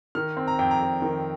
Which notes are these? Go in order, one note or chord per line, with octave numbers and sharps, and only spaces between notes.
D#3 F6
C4
A#5
F2 G5
A#5
F2
D#3